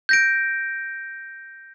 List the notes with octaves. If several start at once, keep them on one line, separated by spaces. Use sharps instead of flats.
G6 A#6 D7